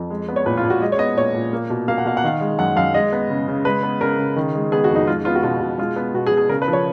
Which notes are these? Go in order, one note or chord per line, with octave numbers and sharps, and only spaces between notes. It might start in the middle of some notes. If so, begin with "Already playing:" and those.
Already playing: F2
G#3
B3
C#5
A#2 B4
F4
A#2
F#4
G#3 D#5
C#5
B3 D#5
A#2 C#5
A#2
A#3
B2
A#3 F5
F#5
B2 F5
F#5
D#3 F5
G#3
F#2 F#5
F#2 F5
G#3 D#5
B3
C#3
C#3
G#3 B4
B3
C#3 A#4
C#3
D#3
G#3
B3 G#4
F#4
F2
D#4
G#3 F4
B3 F4
F#4
B2 F4
B2
G#3 F4
B3
B2 F#4
G#4
B2
G#4
C#3 A#4
B4
F3
C#5